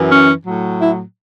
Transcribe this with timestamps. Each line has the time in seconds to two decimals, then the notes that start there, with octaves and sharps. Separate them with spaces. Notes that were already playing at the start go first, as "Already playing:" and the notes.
Already playing: F#2 E3
0.10 C#4
0.44 A2 F#3
0.79 E4